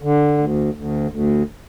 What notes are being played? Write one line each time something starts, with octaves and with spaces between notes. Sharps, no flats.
D3
D2
D2
D2